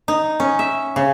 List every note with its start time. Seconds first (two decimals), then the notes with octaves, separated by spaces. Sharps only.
0.08 D#4
0.40 C#4
0.59 E5
0.96 C#3